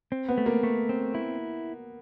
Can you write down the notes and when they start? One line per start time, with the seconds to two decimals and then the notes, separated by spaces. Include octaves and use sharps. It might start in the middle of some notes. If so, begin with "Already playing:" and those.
0.12 C4
0.28 B3
0.38 A3
0.46 A#3
0.63 A3
0.89 C4
1.15 E4